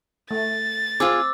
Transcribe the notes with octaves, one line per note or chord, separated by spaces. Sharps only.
A3 A6
C4 F4 G#4 D6 E6